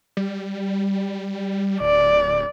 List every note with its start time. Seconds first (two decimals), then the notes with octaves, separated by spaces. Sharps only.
0.17 G3
1.81 D1 D5